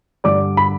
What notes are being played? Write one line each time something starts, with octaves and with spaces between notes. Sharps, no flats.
G2 D3 G3 D5 D6
B5